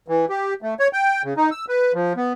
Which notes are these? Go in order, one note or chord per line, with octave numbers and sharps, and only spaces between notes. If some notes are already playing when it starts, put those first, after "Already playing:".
E3
G4
A3
C#5
G5
C#3
D#4
E6
B4
F3
B3